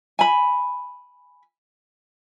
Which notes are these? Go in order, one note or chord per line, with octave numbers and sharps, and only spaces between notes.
G#5 B5